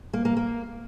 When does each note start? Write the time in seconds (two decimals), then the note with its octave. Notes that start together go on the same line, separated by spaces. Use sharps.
0.13 A#3
0.25 A#3
0.37 A#3